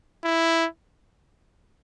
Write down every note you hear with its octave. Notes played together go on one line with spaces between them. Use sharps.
E4